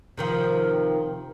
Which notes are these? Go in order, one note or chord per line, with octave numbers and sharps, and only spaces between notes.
C3 D#3 F3